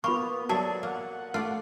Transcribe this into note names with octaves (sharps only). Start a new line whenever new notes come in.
A#3 B3 F4 B5 C#6
F#3 G#4 A4 D5 E5 A5
A#3 F#5
A3 F4 D5